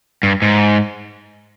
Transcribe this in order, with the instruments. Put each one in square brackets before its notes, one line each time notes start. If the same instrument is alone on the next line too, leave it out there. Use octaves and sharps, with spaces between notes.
[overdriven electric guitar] G2
G#2